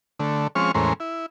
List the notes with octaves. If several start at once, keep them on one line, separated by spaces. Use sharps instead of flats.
D3 A3
F3 G#3 C4 C#4 C#6 F6
E2 A2 G#3 C#4 A#4 C5
E4